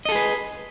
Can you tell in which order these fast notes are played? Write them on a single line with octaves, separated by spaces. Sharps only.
D#5 A4 G#4 B4